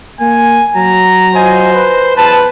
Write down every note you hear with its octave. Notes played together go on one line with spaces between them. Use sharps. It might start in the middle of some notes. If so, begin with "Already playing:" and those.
A#3 G#5
F#3 A#5
F4 C5 D#5 G#5
B4
E2 B4 A5